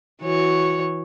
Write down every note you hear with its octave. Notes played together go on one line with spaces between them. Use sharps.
E3 F#4 C#5